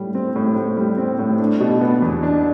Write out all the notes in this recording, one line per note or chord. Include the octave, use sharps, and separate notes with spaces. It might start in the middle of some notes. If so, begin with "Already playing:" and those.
Already playing: A2 G3
C4
A2
A2
G3
C4
A2
D4
B2
B3
E2
D4